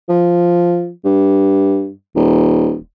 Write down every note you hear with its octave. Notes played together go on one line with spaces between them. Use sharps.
F3
G2
D#1